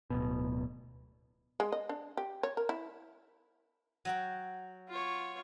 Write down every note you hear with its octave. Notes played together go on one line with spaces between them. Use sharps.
D1 B2
G#3
D#5
D4
G4
C#5
A#4
E4
F#3 F#4 G5
F4 C#5